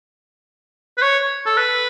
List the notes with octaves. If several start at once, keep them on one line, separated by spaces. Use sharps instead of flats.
B4
C#5
A4
B4